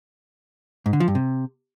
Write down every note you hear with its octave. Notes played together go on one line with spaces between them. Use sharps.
G#2
D3
F3
G2
C3